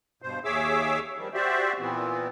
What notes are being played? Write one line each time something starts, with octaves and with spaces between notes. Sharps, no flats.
G2 B2 C5
D#2 G#4 C#5 E5 D6 E6
D#3 F3 G3
F#4 G4 C5 D5 E5
A#2 E3 B3 C4